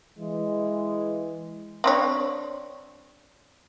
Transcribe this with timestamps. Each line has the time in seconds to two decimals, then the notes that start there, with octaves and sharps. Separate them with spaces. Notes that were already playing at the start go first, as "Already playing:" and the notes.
0.19 E3 G#3
1.84 C4 D4 C#5